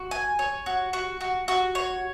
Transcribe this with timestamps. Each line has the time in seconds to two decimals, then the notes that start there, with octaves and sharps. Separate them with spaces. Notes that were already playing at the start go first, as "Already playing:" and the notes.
Already playing: F#4
0.11 G#5
0.39 C#5
0.66 F#4
0.93 F#4
1.21 F#4
1.48 F#4
1.75 C#5